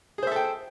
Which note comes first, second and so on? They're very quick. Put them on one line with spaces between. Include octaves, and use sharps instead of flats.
G#4 C5 E5 A4 G5